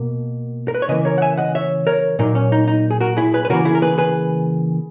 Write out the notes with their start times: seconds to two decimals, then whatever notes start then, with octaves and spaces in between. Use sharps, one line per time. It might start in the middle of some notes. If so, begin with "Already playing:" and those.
Already playing: B2 A#3
0.68 A#4
0.75 B4
0.82 C#5
0.89 C#3 E3 A#3 B4 D#5
1.05 A#4 C#5
1.18 F#5
1.22 E5 G#5
1.38 D#5 F#5
1.55 C#5 E5
1.87 A#4 C#5
2.19 A#2 F#3 A#3 D#4
2.35 C#4
2.52 D#4
2.68 D#4
2.91 G#4
3.01 F#4 A#4
3.17 E4 G#4
3.34 G#4 B4
3.45 B4
3.50 C#3 E3 A#3 F#4 A#4
3.65 E4 G#4
3.75 A#4
3.82 G#4 B4
3.98 G#4 B4